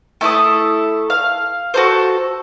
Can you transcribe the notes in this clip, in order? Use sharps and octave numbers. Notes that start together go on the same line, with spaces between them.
A3 E4 A4 D#6
F5
F#4 A4 C5